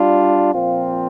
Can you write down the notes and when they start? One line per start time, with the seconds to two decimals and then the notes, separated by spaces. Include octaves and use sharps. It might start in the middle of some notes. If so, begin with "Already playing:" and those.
Already playing: G3 D4 F4
0.54 A#2 F3 C4 F4